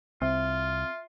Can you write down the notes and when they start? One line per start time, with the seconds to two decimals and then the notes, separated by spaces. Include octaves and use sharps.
0.22 C2 C4 F4 E5